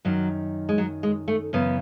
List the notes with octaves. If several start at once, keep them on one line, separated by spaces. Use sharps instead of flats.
F#2 D#3 F#3
G#3
F#3
G#3
A3
F#2 C#3 E3 B3